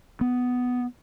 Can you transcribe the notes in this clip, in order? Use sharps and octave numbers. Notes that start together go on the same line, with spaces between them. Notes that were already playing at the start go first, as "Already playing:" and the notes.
B3